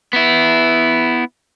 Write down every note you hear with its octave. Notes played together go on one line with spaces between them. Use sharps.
B3 E4